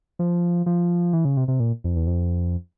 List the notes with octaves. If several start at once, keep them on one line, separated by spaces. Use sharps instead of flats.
F3
F3
E3
C#3
C3
C3
A#2
F2
E2
F2